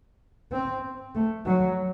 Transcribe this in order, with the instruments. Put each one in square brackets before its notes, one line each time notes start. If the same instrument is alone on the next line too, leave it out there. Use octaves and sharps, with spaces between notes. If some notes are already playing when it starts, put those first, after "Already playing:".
[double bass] C4
A3
F#3